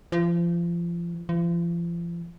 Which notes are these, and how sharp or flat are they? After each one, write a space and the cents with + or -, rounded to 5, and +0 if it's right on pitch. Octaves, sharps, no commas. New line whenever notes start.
F3 -30
F3 -40